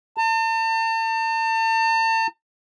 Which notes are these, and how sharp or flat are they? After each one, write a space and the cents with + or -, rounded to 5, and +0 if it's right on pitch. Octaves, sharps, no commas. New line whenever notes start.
A5 +40